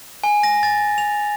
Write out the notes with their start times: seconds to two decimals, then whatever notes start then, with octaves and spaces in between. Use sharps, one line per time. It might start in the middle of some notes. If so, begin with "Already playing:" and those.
0.24 G#5
0.43 A#6
0.63 A6
0.98 F7